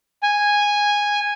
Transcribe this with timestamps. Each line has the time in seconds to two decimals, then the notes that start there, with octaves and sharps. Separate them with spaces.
0.23 G#5